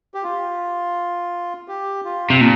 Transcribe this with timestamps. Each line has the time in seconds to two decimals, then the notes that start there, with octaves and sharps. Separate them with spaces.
0.14 G4
0.23 F4
1.68 G4
2.05 F4
2.30 C3
2.41 A#2 D4